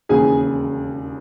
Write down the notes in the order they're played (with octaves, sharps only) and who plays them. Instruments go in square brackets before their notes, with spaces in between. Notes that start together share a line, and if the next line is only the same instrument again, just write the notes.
[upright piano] E1 D#2 C#3 E3 G#4 G#5